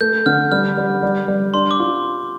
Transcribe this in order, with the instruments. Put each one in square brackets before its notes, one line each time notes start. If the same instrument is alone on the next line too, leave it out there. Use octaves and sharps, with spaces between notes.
[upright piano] A3 [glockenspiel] G6
[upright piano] D3 [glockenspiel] F6
[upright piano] G3 [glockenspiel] F6
[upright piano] G3
G3
G3
[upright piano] D4 [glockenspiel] C6
[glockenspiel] D6
[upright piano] F4